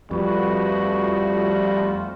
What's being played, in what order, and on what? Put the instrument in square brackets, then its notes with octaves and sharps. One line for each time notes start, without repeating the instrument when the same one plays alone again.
[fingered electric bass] F2 [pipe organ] F3 A3 F#4 [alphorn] G3 [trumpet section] B4 C#6
[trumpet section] C4 F4